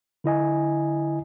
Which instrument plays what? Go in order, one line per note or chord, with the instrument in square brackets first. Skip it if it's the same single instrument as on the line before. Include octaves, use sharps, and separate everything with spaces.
[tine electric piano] D3 E4 D#5 G#5